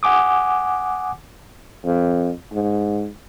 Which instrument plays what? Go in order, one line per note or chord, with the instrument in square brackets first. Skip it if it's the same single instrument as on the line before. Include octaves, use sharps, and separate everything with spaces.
[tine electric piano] F#5 G#5 D6 D#6
[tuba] F2
G#2